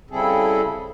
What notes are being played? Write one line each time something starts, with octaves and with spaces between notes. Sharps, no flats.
C#3 G3 C4 E4 G#4 A4